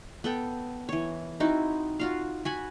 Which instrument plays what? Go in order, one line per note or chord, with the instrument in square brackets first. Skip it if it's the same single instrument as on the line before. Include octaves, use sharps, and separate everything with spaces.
[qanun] B3 A4 G5
E3 C#5
C4 D#4 E4 F#4
F4 F#4 F5
F#4 G#5 B5